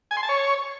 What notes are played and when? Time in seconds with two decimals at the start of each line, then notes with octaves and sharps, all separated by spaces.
0.11 G#5
0.17 C6
0.23 A5
0.29 C#5